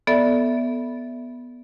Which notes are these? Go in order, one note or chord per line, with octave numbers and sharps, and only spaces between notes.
B3 A4 D5 E5